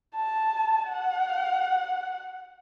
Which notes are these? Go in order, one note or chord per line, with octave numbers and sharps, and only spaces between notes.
A5
F#5